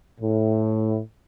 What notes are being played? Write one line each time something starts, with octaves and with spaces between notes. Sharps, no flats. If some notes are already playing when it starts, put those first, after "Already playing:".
A2